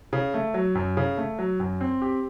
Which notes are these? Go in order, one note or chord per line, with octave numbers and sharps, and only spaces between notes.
C#3
A3
F#3
F#2
C#3
A3
F#3
F#2
C4
G4